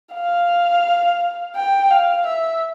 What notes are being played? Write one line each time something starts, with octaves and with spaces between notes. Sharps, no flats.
F5
G5
F5
E5